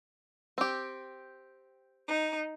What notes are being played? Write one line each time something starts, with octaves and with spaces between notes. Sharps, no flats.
C4 G4
D#4